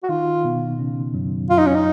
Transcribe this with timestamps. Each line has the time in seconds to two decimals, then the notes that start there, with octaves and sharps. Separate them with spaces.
0.03 F#4
0.09 D#3 D#4 F4
0.44 B2 B3
0.79 C#3 C#4
1.14 F#2 F#3
1.50 F#2 F#3 F4
1.58 D#4
1.66 C#4
1.74 D#4